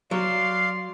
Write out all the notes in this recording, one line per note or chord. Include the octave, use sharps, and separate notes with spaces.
F#3 D5 F5 C6